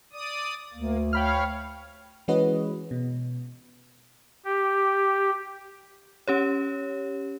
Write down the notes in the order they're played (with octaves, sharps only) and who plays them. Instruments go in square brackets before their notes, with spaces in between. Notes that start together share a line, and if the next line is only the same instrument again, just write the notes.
[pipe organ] D5 D#6
[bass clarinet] D2 [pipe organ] A#3
[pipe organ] C#5 F5 [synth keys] G5 B5 F6
[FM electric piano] E3 G#3 C#4 F#4 B4 D#5
B2
[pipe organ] G4
[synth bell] C#4 G4 C#5